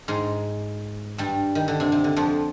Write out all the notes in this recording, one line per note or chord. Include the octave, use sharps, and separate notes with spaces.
G#2 G#3
G2 G3
D#3
D3
C3
C3
D3
F2 F3